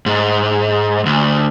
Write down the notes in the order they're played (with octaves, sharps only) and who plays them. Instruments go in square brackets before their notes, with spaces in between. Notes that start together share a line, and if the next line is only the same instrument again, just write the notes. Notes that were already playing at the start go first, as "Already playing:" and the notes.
[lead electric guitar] G#2
D2